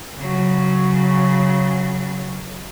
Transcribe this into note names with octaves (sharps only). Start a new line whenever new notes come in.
C#3 F#3